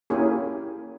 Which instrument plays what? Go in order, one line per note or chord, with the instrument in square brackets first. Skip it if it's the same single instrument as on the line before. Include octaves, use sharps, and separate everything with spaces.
[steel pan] A#3 C#4 E4 G4 G#4